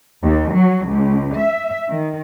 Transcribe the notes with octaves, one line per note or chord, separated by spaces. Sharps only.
D#2
F#3
C#2
E5
D#3